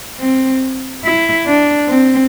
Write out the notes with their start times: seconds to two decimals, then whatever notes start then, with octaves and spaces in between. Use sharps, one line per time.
0.20 C4
1.04 E4
1.46 D4
1.88 C4